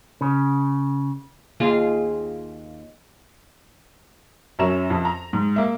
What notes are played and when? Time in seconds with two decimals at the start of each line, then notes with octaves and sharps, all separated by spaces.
0.21 C#3
1.60 D#2 F4 G#4
4.59 F#2 C#4 E5 A#5 E7
4.90 F2
5.05 A#5
5.33 G#2
5.56 A#3 E5